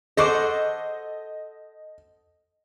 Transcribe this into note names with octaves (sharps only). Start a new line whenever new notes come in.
G#4 A4 C5 D#5 F#5 C#6 D6